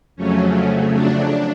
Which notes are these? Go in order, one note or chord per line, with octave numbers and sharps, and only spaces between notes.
F2 C#3 F#3 A3 C#4
D4